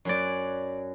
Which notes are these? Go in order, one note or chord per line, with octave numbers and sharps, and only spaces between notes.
F#2 F#3 D5